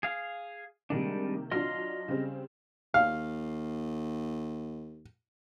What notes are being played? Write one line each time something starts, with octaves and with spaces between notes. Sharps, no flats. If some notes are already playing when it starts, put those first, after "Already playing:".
G#4 F5
C3 D#3 G3 G#3 A#3 D4
F#3 D4 F4 D#5 C6 F6
C#3 G3 C4
D#2 F5